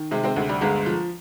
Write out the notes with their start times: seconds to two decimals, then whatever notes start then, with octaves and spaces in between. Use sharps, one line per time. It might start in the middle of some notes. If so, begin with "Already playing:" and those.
Already playing: D#3
0.11 C3 G#3
0.23 G#3 C4
0.36 D2 G#3
0.49 G3
0.61 G1 G#3
0.86 F3